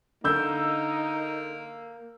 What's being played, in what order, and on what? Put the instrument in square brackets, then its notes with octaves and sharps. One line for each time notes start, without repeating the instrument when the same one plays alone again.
[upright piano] D3 E6 G6 [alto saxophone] A#3 [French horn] D#4